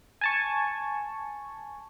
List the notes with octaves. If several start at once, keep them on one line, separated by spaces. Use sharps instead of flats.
G#5 A5 C#6